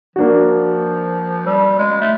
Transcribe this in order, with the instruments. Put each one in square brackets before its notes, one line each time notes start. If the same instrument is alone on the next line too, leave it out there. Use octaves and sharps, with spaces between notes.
[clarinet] F3 [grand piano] A#3 D4 F#4
[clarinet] G3
G#3
A3